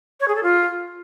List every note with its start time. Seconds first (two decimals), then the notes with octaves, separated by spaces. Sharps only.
0.20 C#5
0.28 G#4
0.35 A4
0.43 F4